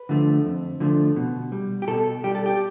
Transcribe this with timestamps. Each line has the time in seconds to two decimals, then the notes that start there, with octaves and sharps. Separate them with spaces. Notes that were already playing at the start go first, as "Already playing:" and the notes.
Already playing: B4
0.09 D3 F3 A3
0.45 F2
0.80 D3 F3 A3
1.16 B2
1.52 G3
1.82 G4
1.87 B2 A4
2.24 G3 G4
2.35 A4
2.46 G4